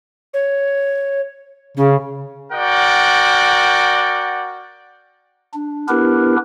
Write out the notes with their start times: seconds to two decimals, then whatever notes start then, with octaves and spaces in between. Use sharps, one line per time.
0.34 C#5
1.77 C#3 C#4
2.53 F#4 A#4 D5 F#5 G5
5.53 D4
5.88 B3 D4 E4 G4 A#4 B4